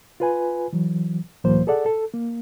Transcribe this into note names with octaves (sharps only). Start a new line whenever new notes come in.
F4 B4 G#5
E3 F#3
C#2 A2 E3 F#3 A#3 C5
G#4 A4 D5 F#5
A4
A#3